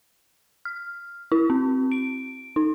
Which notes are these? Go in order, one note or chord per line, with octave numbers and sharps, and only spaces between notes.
F6
E4
C4
D7
D#4